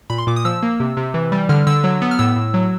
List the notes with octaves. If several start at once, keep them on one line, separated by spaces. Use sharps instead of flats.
A#2 B5
C6
A#2 D6
D#6
F3 E6
A#3
C3
C3
E3
G3
D3 F6
D3 E6
F#3
B3
F6
A2 E6
A2
F#3